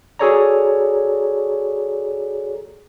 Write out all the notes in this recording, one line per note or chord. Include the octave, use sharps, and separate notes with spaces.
F#4 G#4 A4 C#5 D5 A#5